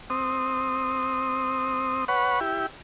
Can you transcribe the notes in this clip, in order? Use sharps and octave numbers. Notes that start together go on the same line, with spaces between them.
C4 D#6
B4 C#5 F#5
E4 G4